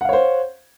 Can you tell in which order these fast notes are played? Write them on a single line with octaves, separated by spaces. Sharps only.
F#5 F5 C#5 C5